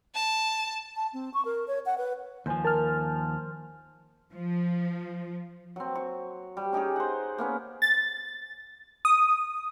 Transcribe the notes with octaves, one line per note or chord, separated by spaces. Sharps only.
A5
A5
C4
C#6
A#4
C#5
F#5
B4
D#2 F3 C5 G#5
A#4 A5 F6
F3
F#3 C4
C#6
G3
C#4 D#4 G4 G#4
C5 F#5
A#3 B3 C#4
A6
D#6